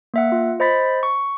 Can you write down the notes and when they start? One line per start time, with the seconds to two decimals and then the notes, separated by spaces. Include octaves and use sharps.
0.14 A#3 E5 F#5
0.32 F4
0.60 C5 D#5 B5 A6 B6
1.03 C#6